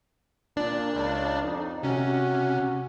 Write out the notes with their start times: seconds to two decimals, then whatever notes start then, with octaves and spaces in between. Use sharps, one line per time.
0.57 A#2 D4 D5
0.93 C#2
1.43 F2 D#4
1.83 C3 C#4 F#4